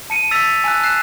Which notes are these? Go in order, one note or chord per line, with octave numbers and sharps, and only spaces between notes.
A5 C#7 D#7
E6 A6 B6 F7
G#5 A5 E6 F#6
F#6 C7 E7